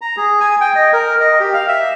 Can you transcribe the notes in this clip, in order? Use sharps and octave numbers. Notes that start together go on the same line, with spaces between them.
A#5
G#4
G#5
G5
D#5
A#4
D#5
G4
F5
E5